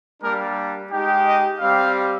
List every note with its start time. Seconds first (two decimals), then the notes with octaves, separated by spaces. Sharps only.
0.22 G3 A#3 D4 A#4
0.91 G#3 D#4 G4
1.26 D#5
1.60 G3 C4 G4 F5